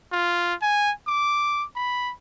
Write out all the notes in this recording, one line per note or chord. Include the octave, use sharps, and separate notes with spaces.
F4
G#5
D6
B5